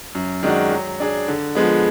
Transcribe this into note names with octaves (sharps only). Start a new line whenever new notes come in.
F#2
D#3 G#3 D4 F#4
F#3
D4 G#4
D3
F3 G#3 B3